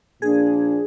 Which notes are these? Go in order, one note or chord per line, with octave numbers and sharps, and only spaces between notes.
A#2 F3 A#3 D4 F4 G#4